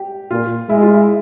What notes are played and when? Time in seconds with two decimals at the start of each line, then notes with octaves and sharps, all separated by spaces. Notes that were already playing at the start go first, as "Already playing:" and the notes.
Already playing: G4
0.31 A#2 F4
0.69 G#3 E4
0.82 F4
0.94 E4